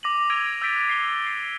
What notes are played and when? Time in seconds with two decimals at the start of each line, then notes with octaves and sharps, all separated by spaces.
0.03 D6 A#6 D#7 F#7
0.30 E6 G#6 A#6 D7 D#7 F7
0.62 E6 G6 A6 B6 D7
0.75 F#6 A6 B6
0.89 C7 G7
1.26 C7 G7